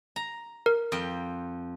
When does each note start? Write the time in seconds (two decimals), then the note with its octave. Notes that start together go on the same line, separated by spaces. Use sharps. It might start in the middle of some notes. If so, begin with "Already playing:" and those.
0.16 A#5
0.66 A#4
0.92 F2 G5